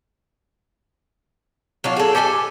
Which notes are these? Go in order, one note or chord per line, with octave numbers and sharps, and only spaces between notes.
F#3 D4 F4
G#4 A4
G4 A4 D5 G#5